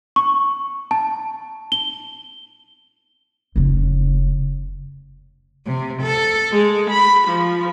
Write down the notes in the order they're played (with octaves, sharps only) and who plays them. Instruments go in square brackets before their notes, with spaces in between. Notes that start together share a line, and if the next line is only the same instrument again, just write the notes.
[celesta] C#6
A5
G7
[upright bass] F1 C#3
[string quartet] C3
A4
G#3
B5
F3